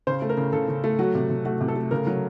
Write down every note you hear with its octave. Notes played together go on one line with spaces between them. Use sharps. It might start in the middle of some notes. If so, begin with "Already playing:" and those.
C#3 C5
A3
A#4
C#3
C#3 A4
C#3
A3
F#3 F#4
C3
C3
A3 F#4
C3
A4
A3
C#3 A#4
F#3